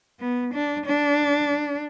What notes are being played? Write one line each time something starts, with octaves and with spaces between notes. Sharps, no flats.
B3
D4
D4